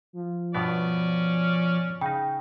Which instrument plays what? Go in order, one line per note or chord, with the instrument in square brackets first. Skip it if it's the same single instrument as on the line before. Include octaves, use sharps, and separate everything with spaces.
[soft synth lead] F3
[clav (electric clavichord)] G2 B2 B3 [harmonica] C#4 D5
[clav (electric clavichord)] C#3 D#4 [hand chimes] G5